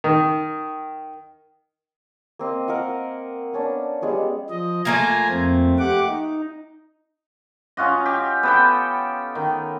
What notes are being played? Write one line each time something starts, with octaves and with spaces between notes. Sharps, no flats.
D#3
A#3 C4 D#5
A#4 D#5 F5 F#5
B3 C#4 D4
G3 G#3 B3 C#4
F3 D#5
A3 A#3 F4 G#5 A#5
F2 C4
G4 F#5 D6
D#4
C#4 F4 F#4 D#5
G4
B3 A4 G5
D#3